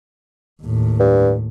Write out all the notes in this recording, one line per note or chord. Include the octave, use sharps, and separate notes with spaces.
D#2 A2
G2